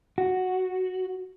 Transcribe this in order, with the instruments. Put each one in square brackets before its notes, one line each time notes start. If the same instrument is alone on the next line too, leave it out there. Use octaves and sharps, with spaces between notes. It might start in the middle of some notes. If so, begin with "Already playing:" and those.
[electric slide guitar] F#4